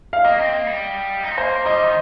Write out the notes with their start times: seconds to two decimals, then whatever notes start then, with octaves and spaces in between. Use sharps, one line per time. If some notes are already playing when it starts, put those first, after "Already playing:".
0.13 F5
0.24 A#3 D#5
0.39 C4
0.53 A#3
0.67 G3
1.23 D#4
1.31 C4
1.37 A#3 C5
1.66 G3 D#5
1.83 D#3